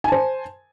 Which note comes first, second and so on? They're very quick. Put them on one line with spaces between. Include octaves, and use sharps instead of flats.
G#5 A5 C5